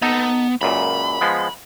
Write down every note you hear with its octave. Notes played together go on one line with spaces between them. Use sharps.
B3 D#4 A4
C#2 F#2 A#2 B5
F3 G#3 B3